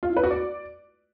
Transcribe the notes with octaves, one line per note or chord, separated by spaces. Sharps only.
F4
E4
B4
F#4
D5